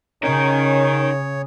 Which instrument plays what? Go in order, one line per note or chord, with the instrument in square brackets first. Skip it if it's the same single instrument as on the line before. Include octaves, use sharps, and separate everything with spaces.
[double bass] C#3 [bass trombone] C#4 [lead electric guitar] D#4 A#4 [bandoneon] C#5